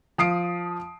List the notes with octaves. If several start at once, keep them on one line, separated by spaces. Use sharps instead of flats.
F3 D#6 C7 D7